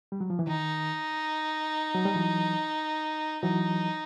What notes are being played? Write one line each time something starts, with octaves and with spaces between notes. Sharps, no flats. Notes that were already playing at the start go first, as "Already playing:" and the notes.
G3
F#3
F3
E3
D#3 D#4
F#3
G3
E3 F#3
E3 F#3 D#4